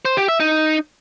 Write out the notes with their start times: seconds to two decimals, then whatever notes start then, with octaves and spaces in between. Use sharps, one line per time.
0.05 C5
0.17 G4
0.29 E5
0.40 D#4